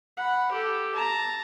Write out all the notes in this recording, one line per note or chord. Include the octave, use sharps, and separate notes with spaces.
F#5 B5
G4 A4
A5 A#5